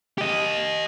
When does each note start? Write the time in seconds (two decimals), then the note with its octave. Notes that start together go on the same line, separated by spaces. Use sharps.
0.18 G4 D#5